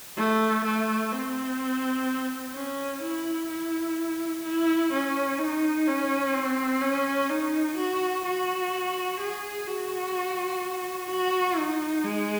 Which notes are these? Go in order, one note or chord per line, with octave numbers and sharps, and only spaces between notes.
A3
A3
C4
C#4
E4
E4
E4
C#4
D#4
C#4
C4
C#4
D#4
F#4
F#4
G#4
F#4
F#4
D#4
G#3